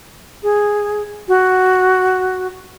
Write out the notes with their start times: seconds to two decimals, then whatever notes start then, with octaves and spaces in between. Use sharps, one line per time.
0.43 G#4
1.28 F#4